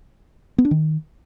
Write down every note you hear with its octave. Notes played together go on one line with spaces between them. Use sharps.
B3
D4
D#3